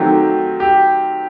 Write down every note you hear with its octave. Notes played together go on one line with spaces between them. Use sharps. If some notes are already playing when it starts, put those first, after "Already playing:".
Already playing: D#3 F#3 A3 C4 G4
G4